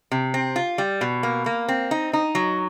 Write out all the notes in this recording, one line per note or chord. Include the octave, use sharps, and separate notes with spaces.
C3
C4
F4
G3
B2
A#3
A#3
C4
D#4
D#4
F#3